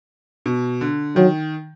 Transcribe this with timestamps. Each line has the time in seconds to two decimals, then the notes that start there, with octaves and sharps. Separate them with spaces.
0.46 B2
0.81 D3
1.16 D#3 F#3